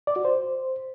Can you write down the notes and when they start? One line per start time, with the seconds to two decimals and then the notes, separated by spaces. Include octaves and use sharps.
0.07 D5
0.16 F#4
0.25 C5